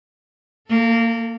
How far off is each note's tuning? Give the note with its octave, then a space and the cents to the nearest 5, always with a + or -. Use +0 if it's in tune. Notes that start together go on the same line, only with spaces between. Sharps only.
A#3 -20 A4 +25